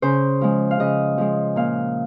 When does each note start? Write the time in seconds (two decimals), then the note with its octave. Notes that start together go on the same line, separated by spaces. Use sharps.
0.02 C#3 C5
0.41 F3 G#3
0.71 F5
0.80 C#3 D#5
1.18 F3 G#3
1.56 A#2 F5